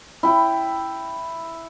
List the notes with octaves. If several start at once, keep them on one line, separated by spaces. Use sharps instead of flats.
E4 G5